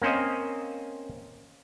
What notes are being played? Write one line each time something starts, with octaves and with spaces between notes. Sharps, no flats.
A#3 C4 C#4 C5 D#5